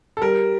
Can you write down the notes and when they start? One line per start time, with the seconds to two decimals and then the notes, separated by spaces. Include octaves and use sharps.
0.17 A4
0.21 G3 A#4